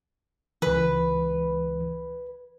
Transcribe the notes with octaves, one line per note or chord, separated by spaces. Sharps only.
C#2 E3 B4